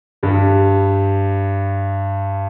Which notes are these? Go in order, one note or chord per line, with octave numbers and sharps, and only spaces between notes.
G2 G3